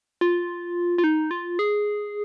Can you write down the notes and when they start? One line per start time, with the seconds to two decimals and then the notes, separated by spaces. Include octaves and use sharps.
0.21 F4
0.98 F4
1.04 D#4
1.31 F4
1.59 G#4